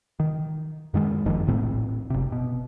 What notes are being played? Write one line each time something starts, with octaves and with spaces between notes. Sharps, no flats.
D#3
F#2 D#3 G#3
F#1 F2 D#3 F3
D#1 A#1 A2 C4
F#1 C3
B2